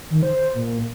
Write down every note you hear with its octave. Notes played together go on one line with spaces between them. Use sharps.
D#3
C5
A#2